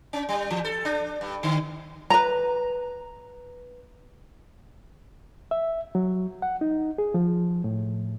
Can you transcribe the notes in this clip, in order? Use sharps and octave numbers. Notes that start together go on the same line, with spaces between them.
C#4
G3
E3
A4
D4
G2
D3
B4 A#5
E5
F#3
F#5
D#4
G#4
F3
A2